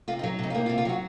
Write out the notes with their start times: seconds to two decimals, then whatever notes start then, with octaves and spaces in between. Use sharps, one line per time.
0.08 C3 F4
0.19 D#4
0.24 F#3
0.39 C3 D#4
0.50 F4
0.55 A#3 D#4
0.66 F4
0.69 C3
0.78 F4
0.85 F#3 F#4